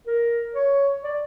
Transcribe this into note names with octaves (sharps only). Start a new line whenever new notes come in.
A#4
C#5
D5